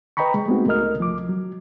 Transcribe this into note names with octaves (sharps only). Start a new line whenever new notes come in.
B4 D#5 G5 A#5 B5 C#6
G#3
G#3 A3 B3 C4 D#4 F#4
C#2 A3 A#4 D#5 F6
C2 F3 D6
F#3